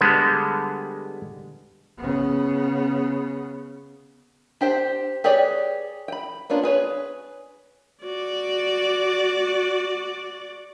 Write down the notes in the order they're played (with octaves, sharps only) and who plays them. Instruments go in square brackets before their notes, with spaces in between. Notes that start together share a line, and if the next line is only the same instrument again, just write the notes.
[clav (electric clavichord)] D3 G3 G#3 B3
[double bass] C#3 B3
[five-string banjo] D4 G4 C5 G5
G4 G#4 B4 C#5 D5
G5 B5
A#3 B3 C#4 D4 F4
G#4 B4 C#5
[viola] F#4 D5